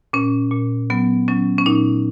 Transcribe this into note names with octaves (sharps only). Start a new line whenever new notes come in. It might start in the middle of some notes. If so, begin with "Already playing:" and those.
A#2 C#4
A#2
F#3 B3
F#3 C#4
C#4
A#2 D#4